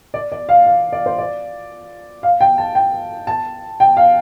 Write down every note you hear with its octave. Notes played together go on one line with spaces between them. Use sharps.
D5
D5
F5
F5
D5
C5
D5
F5
G5
A5
G5
A5
G5
F5